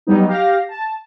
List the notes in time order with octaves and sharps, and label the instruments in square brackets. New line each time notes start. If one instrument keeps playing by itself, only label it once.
[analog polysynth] F#3 G3 B3 D#4
G4 F5 A#6
A5